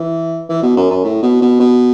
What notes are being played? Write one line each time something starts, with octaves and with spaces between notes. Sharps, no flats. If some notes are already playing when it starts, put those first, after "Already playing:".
Already playing: E3
E3
B2
F#2
F#2
A2
B2
B2
B2